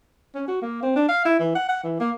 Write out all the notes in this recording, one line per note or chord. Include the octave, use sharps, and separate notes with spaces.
C#4
F#4
A#3
C4
D4
F5
E4
E3
F#5
F#5
E3
A#3